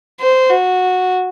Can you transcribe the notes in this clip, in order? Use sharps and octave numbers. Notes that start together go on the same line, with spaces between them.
C5
F#4